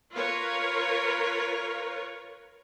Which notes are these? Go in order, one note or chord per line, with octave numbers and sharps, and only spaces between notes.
F4 A#4 B4 C#5